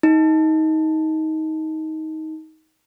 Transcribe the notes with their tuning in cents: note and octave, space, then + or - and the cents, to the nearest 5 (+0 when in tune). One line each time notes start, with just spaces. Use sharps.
D#4 +20